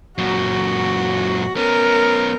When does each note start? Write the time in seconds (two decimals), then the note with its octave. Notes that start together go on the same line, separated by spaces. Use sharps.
0.18 F#2 A#2 F#4
1.57 B3 C#4 A#4